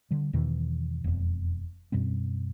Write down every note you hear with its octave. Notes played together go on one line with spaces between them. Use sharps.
D3 G3
E2 B2 D#3 E3
E1 F2
F#2 B2 G3 C4